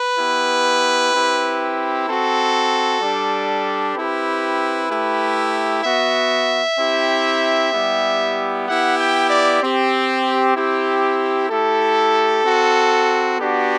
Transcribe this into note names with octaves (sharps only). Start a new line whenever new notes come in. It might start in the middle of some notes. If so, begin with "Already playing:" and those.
Already playing: B4
B3 E4 G4
C4 E4 G4
C4 F#4 A4
G3 D4 G4
C4 E4 G4 B4
A3 E4 G4
B3 F#4 E5
C4 E4 G4
G3 B3 E4 G4
B3 E4 G4 F#5
G5
D5
C4 G4
C4 E4 G4
A3 E4 G4 A4
C4 F#4
B3 D4 F#4 G4